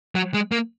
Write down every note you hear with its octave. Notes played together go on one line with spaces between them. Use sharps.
F#3
G#3
A#3